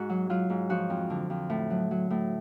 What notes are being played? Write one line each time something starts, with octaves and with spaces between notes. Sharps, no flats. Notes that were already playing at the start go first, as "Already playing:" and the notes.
Already playing: G#2 F#4
F#3
F#3 F4
G#2
F3 F#4
F2
D3
F2
A2
F#3
F#3
A2